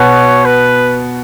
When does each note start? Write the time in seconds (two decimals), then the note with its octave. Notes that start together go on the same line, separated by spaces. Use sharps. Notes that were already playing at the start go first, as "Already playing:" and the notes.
Already playing: B2 B3 F#4 C#5
0.45 B4